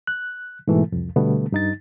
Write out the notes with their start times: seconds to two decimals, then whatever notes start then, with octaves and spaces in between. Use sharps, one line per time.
0.07 F#6
0.68 G#2 B2 E3 A3
0.92 C2 F2
1.16 B2 D3 G3 A3 B3
1.52 G2 D#4 A6